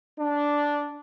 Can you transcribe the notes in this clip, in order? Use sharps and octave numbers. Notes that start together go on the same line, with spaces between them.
D4